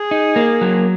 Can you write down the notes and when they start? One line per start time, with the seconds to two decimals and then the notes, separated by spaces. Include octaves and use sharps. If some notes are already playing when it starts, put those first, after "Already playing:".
Already playing: G#4
0.11 D#4
0.36 A#3
0.61 F#3